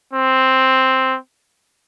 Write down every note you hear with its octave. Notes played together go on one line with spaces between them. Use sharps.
C4